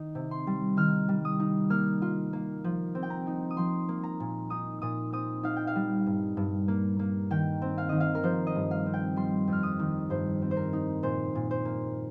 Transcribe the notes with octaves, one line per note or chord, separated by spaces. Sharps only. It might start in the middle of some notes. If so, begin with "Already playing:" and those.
Already playing: D#3 D#4
C3
C6
G3
D#3 F6
G3
D#6
D#4
A#3 F6
F4
A#3
F3
C4
G5
A#5
D#4
D#6
F3 C6
A#3
A#5
A#2
D#4 D#6
A#2 D#6
C4 D#6
D#4 F5
G5
F5
G3
G2
G2
A#3
A#3
D#3 G5
C4
F5
D#3 D#5
F5
A#4
F3 C5
D#5
G2
F5
C4
G5
G3 C6
F2 F6
D#6
D#3
G2 C5
C4
C5
A#4
D#4
A#2 C5
A#2
C5
A#3